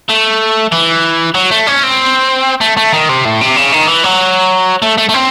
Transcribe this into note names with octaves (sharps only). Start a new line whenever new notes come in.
A3
E3
F#3
A3
C#4
C4
A3
A3
D#3
C3
A2
C3
C#3
D#3
E3
F#3
A3
A3
A3
C4